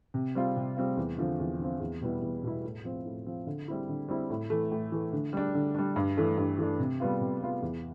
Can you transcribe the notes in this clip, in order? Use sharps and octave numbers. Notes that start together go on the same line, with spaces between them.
C3
G3 C4 F4
C3
G3 C4 F4
E2
D3 F3 C4
E2
D3 F3 C4
E2
B2 G3 B3 E4
E2
B2 G3 B3 E4
A2
F3 C4
A2
F3 C4
D3
G3 C4 E4
D3
G3 C4 E4
A2
E3 A3
A2
E3 A3
D3
G3 D4
D3
G3 D4
G2
E3 A3 D4
G2
E3 A3 D4
C3
G3 B3 F4
C3
G3 B3 F4
E2